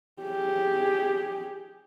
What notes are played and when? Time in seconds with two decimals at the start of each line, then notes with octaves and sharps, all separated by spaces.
0.23 G4 G#4